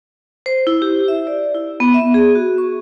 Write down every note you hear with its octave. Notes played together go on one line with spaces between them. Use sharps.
C5
E4
G4
E5
D5
E4
B3
E5
G#4
F#4
C#6